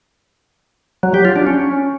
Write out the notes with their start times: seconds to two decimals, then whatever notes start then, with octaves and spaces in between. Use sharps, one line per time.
1.03 F#3
1.14 G4
1.25 F4
1.36 D4
1.47 C#4